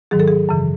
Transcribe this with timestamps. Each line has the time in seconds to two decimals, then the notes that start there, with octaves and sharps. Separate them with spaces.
0.11 G#2 D#3 F#3 G#4
0.20 A4
0.28 G#4
0.49 F#2 C#3 E3